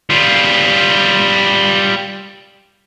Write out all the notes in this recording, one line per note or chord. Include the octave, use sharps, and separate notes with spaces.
G3 F4